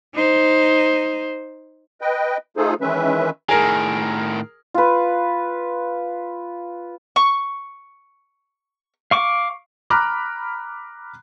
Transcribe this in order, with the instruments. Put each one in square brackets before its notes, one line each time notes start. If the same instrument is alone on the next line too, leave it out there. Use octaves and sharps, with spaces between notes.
[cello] D#4 C5
[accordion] B4 D#5 G5
A3 D#4 F4 G#4 A4 C5
D#3 E3 G#3 C#4 B4 E5
[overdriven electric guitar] A2 D#3 [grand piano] G#4 A#4
[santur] F4 B4
[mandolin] C#6
[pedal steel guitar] F5 C#6 D6
[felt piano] A#5 B5 D6 F6 F#6